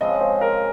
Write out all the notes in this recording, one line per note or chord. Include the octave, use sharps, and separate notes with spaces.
C#3 F3 G#3 C4 D#5
C5
A#4